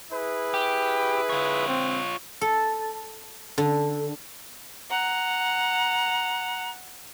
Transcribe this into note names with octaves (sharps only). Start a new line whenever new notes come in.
E4 G#4 B4
G4
F4 C#5
C4
A4
D3
F#5 A#5